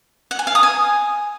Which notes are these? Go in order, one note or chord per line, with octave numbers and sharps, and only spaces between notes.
F#5
G#5
F5
D#6
G#5